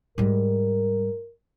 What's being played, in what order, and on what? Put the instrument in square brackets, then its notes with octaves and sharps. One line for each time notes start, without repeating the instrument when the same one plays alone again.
[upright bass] G#2 G3 [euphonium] A#4